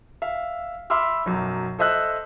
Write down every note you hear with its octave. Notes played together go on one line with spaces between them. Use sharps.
E5 F5
E5 B5 C6 D6 E6 F6
B1 F#2
A4 C5 D#5 E5 E6 F#6